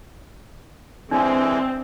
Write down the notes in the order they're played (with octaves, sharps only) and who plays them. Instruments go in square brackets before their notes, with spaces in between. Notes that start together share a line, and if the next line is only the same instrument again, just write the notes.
[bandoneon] D3 E3 G#3 [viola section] C4 [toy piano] D4